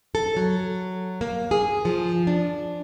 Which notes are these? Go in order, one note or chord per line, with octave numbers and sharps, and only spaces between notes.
A4
F#3
A#3
G#4
F3
D4